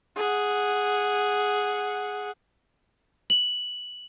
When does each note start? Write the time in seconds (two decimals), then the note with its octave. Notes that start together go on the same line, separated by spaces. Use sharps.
0.17 G#4 F#5
3.30 F#7